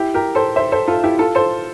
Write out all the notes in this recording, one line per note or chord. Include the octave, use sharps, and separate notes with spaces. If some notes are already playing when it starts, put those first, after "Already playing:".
Already playing: E4 G4
G4 A#4
A4 C5
C5 E5
A4 C5
F4 A4
E4 G4
F4 A4
A4 C5